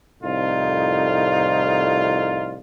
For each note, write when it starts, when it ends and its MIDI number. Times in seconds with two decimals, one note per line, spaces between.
0.23 2.58 36
0.23 2.58 41
0.23 2.58 45
0.23 2.58 63
0.23 2.58 65